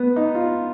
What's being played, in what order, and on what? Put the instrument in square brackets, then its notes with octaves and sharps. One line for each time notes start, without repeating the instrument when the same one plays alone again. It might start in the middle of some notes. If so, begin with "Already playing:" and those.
Already playing: [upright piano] B3
D#4
F4